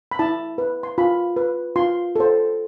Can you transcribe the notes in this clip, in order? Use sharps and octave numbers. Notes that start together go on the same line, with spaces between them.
B5
E4 A5
B4
C6
F4 B5
B4
F4 C6
A4 C5